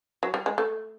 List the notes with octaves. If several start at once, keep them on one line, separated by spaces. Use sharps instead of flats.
F#3
G3
G#3
A3